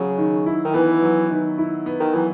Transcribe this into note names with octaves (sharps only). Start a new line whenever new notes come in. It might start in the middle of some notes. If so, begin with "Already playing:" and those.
Already playing: C#3 F#3
D#3
E4
D#3
E3 B3
F#3
D#3
E4
B3
D#3
E3 F#3